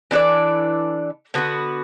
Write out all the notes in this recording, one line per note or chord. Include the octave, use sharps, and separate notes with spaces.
E3 D4 A4 D5
D3 B3 F#4 B4